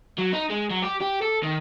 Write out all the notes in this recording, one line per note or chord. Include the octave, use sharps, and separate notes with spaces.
F#3
D#4
G#3
F#3
G4
G4
A4
D#3